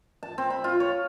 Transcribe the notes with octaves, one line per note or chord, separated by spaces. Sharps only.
A5
C4
B5
F4
C#5